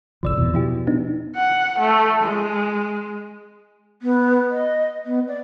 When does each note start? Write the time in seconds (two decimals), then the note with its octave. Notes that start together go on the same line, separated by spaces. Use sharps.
0.23 G1 C2 F2 F3 D5 E6
0.37 E2 B2 E3
0.54 B2 F3 E4 G4
0.87 B3 D4 D#4
1.36 F#5
1.79 A3
2.24 G#3
4.02 B3
4.50 D#5
5.06 B3
5.28 D5